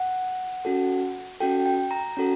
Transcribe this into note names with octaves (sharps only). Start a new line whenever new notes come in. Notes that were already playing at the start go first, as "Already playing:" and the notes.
Already playing: F#5
C#4 F#4 A4
C#4 F#4 A4 G5
G5
A#5
C#4 F#4 A4